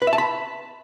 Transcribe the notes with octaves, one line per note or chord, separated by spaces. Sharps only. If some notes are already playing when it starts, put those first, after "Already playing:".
B4
E5
A5
B5